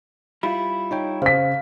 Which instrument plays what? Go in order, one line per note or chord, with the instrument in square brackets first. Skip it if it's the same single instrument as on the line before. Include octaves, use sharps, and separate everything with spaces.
[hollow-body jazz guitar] G3 E4 F4 [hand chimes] B5
[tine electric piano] D#4 C#5 G5
[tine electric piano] C#3 [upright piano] C5 B6 [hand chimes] F5